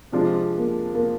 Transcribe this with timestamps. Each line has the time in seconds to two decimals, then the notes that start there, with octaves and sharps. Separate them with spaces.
0.12 C3 F3 G#3 C4 D4 F4
0.58 A#3
0.95 A#3